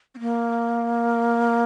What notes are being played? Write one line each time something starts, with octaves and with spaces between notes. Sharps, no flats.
C4
A#3